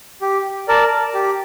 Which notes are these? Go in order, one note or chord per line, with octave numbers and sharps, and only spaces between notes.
G4
A#4 D5 A5
G4